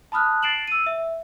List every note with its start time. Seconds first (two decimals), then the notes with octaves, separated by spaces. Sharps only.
0.12 A5 B5 D#6 F6 F#6
0.43 A6 C7 D7 E7 F#7
0.67 E6 D#7
0.86 E5